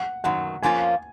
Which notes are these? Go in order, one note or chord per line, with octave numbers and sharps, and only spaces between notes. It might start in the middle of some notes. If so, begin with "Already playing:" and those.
Already playing: F#5
F#2 D#3 F#3 F#5
F2 F3 A#3 C#4 F4 G#5